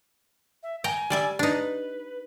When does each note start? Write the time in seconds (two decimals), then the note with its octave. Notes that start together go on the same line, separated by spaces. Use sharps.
0.63 E5
0.84 G5 G#5 A#5
1.10 G3 D5 E5
1.39 D4 D#4 B4